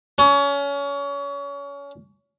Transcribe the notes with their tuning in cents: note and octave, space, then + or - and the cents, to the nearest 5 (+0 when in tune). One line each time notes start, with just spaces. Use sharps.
C#4 +30